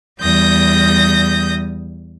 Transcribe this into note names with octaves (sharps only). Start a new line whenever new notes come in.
E2 G3 D#6 G6 A#6